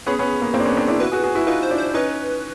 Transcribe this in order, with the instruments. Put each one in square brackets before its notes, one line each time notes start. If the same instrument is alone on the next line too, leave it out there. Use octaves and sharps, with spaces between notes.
[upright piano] B3 C#4 [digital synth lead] G#4
[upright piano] B3 C#4
A#3
A#3 C4
D4
B3 C#4
C4 D4
D4 E4
[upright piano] E4 F#4 [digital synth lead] B4
[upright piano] F#4 G#4
F#4 G#4
E4 F#4
[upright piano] D#4 F4 [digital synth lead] B4
[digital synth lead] C5
[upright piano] D4 E4
[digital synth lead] C5
[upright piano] C#4 D#4 [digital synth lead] B4